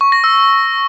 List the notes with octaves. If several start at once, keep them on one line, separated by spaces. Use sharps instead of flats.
C#6
A#6
E6